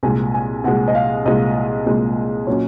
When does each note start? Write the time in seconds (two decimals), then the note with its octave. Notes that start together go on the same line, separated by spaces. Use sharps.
0.03 C2 A#2 G#3 G#5
0.34 G#5
0.64 C2 A#2 G#3 F#5
0.88 D#5
0.95 F5
1.25 C2 A#2 G#3 D#5
1.86 C2 A#2 G#3
2.47 A#2 F#3 C#4 C#5